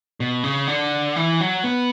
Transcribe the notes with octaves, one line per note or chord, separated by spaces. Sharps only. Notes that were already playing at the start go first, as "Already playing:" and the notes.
B2
C#3
D3
E3
F#3
B3